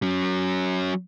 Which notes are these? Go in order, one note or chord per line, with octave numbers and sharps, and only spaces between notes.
F#3 C#4